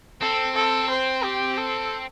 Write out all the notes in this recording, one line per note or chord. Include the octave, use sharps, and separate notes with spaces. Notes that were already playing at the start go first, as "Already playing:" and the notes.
C4 A4
A4
C5
G4
A4